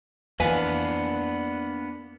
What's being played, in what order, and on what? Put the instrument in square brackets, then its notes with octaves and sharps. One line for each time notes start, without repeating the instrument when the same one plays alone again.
[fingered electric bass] F2 E3 [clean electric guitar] A#3 B3 D4 [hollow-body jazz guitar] B4 F5 G#5